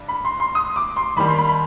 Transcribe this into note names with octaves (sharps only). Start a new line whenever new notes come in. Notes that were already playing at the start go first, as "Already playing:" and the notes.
Already playing: G2
B5
C6
C6
D#6
D6
C6
D#2 D#3 G3 B5
C6
B5
B5